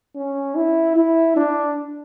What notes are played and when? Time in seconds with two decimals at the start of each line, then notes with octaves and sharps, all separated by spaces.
0.16 C#4
0.56 E4
0.96 E4
1.37 D4